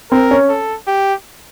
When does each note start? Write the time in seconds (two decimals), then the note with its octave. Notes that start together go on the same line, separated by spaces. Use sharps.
0.11 C4 A#4
0.31 C#4
0.49 A4
0.87 G4